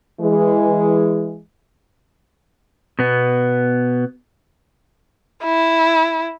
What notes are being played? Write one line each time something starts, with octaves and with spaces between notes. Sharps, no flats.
E3 G#3
B2 B3
E4